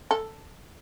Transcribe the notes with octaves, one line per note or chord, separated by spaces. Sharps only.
A4